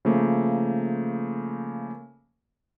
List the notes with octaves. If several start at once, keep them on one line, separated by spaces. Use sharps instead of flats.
C#3 F3 A3 A#3